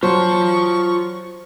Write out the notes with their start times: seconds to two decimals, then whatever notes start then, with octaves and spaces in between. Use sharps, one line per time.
0.03 F#3 F4 C5 A5 C#6